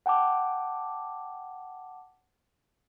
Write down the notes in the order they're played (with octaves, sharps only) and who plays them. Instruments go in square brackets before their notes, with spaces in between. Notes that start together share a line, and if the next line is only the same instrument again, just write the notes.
[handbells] F#5 G5 A5 D6